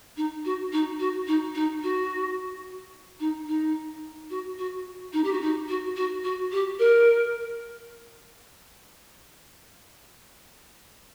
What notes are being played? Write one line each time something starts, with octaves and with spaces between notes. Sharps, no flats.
D#4
F#4
D#4
F#4
D#4
D#4
F#4
D#4
D#4
F#4
F#4
D#4
G4
F#4
D#4
F#4
F#4
F#4
G4
A#4